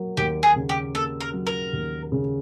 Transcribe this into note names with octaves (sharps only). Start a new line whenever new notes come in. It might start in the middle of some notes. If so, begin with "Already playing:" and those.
Already playing: F#3 A#3
D#2 G4
G#4
C#3
G4
A#3 A4
A#4
F#3
A#4
D#2
C#3